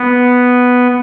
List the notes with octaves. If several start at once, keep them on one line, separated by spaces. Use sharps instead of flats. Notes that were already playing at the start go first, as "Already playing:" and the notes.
Already playing: B3